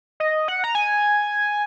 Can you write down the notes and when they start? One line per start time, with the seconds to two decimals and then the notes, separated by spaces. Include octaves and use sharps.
0.20 D#5
0.48 F#5
0.64 A#5
0.75 G#5